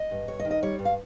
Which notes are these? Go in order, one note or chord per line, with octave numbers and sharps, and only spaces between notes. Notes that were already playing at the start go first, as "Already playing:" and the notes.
Already playing: D#5
G2
G2 C#5
D#5
D#3
D#5
G3 C#5
G2
F5